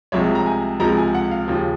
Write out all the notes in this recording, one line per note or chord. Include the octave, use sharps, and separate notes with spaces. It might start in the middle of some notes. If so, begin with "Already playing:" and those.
C2 C3 F3 G#3 C#5
A#5
G#5
C#2 C3 F3 G#3 A#5
G#5
F#5
F5
D#2 C#3 F3